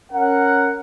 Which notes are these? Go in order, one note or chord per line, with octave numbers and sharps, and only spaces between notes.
C#4 A#4 F#5